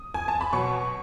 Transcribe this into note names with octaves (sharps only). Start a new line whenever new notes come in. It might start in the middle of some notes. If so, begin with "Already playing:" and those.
Already playing: D#6
G#5
A5
B5
B2 F#3 C#6